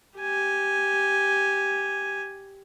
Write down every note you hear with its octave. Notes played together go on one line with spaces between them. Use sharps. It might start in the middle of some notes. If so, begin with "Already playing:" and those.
G4 G#5